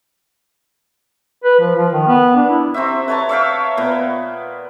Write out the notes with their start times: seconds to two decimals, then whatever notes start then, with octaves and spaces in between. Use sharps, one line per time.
1.44 B4
1.60 F3
1.76 F3
1.92 D#3
2.07 B3
2.36 D4
2.50 E4
2.74 C3 C4 F#4 E5
3.08 B4 C#5 A5 A#5
3.29 C#5 E5 F5 G5
3.77 A#2 B3